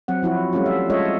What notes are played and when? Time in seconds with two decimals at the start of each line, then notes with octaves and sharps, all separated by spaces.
0.08 F#3 C4 F#5
0.23 F3 E4 F#4
0.53 G3 A3 C#4 F4
0.66 E5
0.90 G#3 F4 A4 C#5 D#5 E5